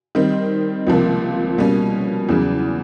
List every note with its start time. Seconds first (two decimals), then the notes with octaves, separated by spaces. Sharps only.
0.15 D#3 G3 C4 D#4
0.87 C#2 C3 F3 A#3
1.58 B2 G3 A#3 C#4
2.29 E2 C#3 F#3